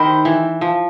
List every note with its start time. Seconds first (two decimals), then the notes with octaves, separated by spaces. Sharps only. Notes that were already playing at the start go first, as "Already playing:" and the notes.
Already playing: D#3 E4 G4 C5 D#5
0.25 E3
0.61 F3